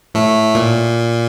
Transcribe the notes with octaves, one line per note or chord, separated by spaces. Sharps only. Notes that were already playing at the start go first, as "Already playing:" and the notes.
A2 A3
A#2